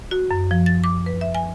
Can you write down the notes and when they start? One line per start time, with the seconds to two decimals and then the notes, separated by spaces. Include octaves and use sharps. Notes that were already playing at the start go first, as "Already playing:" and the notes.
0.11 F#4
0.31 F#2
0.51 F3
0.66 A6
0.84 D6
1.06 B4
1.21 E5
1.35 G#5